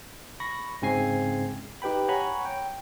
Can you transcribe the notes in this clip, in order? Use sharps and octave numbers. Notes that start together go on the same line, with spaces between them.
B5 C#6 A#6
G#2 C#3 C4 G#5 G#6 C7
D#4 G4 B4 G5 B5
C#5 F#5 G#5 A#5 B5 C#6
G5